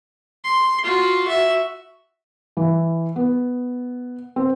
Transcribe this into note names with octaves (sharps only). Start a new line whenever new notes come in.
C6
F4 F#4
F#4 E5
E3
B3
C4